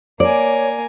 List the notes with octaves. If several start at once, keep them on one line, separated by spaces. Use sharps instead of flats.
A#3 C#5 D5 G#5